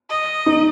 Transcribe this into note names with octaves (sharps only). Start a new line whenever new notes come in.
D#5
D#4